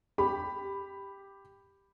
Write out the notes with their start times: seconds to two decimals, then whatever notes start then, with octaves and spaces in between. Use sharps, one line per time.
0.18 G4 B5